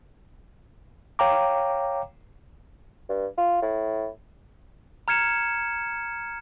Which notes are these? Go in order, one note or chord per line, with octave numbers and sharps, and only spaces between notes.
C#5 F5 G5 A#5 D6
G2
F4
A2
A#5 F6 G#6 C#7 E7